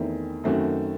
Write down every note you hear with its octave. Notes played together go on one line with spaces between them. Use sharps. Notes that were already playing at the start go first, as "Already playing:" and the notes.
Already playing: E2 D#3 A3 C4 E4
F#2 D#3 A3 C4 F#4